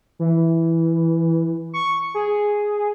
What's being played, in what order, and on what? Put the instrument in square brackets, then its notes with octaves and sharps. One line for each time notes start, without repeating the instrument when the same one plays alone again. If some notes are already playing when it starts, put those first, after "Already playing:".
[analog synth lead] E3
C#6
G#4